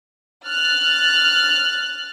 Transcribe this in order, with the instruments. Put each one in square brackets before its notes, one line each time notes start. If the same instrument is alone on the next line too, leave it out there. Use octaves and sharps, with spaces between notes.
[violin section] F6 F#6 A6